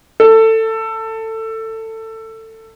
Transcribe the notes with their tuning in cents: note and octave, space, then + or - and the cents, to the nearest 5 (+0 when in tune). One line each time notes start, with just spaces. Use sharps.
A4 +20